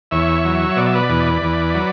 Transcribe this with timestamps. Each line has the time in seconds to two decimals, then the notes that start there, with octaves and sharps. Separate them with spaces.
0.11 E2 C#5 E5
0.45 F#3
0.76 B2 D5
0.86 E5
0.94 B4 D5
1.09 E2
1.42 E2
1.74 F#3